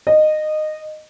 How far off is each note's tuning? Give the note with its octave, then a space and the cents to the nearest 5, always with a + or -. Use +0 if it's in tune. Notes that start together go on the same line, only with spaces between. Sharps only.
D#5 -15